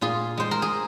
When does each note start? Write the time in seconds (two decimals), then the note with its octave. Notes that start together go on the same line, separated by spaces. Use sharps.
0.01 A#2 F4 G#4
0.37 G#3 C5
0.51 A#4
0.62 G#4